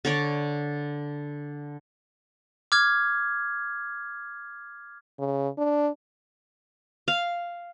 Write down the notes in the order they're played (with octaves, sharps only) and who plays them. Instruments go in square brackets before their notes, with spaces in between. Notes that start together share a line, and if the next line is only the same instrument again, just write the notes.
[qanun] D3 C#5 D5
[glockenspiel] D6 F6 G#6
[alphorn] C#3
D4
[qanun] F5